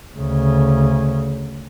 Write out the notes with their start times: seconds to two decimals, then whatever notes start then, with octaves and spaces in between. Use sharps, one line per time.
0.18 D2 C#3